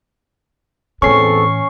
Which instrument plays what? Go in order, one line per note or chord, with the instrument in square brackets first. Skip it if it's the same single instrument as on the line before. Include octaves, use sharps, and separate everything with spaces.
[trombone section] E2 C4 A4 [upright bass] A2 E3 [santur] C#4 [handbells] C#6 C7